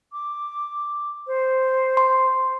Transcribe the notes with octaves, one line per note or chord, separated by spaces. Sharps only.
D6
C5
C6